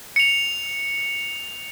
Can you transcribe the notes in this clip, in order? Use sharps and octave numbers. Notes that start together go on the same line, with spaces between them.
C#7 F7